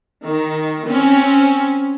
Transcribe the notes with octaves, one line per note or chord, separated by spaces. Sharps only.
D#3
C4 C#4